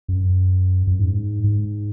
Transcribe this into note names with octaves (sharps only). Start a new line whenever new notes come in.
F#2
F#2
G#2
G#2